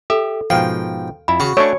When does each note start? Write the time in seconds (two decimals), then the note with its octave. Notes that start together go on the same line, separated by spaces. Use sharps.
0.10 G4 A4 E5
0.50 G#2 B2 F3 F5 G5
1.28 F2 E4 B5
1.40 C#3 F#4
1.57 A3 D4 C#5